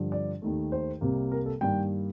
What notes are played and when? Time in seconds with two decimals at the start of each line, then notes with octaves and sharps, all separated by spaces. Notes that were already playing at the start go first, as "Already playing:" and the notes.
Already playing: G2 D3 F3
0.12 D5
0.42 D#2 D#3 A3
0.72 C5
1.01 C2 C3 G3 A#3
1.32 A#4
1.46 A4
1.61 G2 D#3 G3 A#3 G5